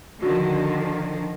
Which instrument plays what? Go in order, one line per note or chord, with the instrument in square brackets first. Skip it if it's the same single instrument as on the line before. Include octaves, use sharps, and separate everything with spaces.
[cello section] D3 D#3 F3 [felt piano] F#4